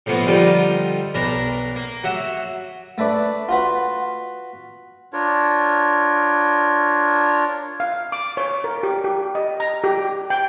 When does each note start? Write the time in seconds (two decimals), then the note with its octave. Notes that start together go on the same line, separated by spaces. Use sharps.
0.06 A2 F3 A#3 B3 C#6
0.26 D3 F3 G3 D#4 F4 D6
1.15 B1 D4 A#4 B5
1.76 A#3
2.04 F#3 F#4 E5
2.98 A3 A4 B4 D5
3.49 F4 F#4 B4
5.13 D4 F4 A#4 C#5
7.80 F5
8.12 D6
8.37 C#5
8.64 A#4
8.83 G4
9.04 G4
9.35 D#5
9.60 A#5
9.84 G4
10.30 G5